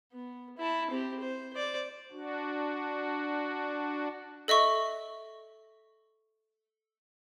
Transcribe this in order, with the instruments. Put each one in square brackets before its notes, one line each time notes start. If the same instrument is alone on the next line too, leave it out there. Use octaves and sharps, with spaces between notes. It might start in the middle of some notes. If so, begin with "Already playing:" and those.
[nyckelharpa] B3
E4 A5
C4 G4
C5
C5 D5
[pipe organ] D4 F#4
[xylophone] A4 D#5 E5 C#6